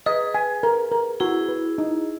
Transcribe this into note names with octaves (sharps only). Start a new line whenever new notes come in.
G#4 B4 D#5
G#5
A#4
A#4
E4 F#4 G#4
B4
D#4